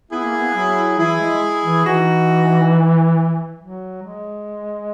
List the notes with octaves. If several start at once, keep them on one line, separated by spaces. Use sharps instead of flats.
B3 E4 G#4
A#3
B3
F#3
E3 E4 G#4
G#3
E3
E3 D#4 F#4
F#3
G#3